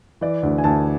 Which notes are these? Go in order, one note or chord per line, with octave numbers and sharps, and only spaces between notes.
E3 D5
D2
G#5
D2 A5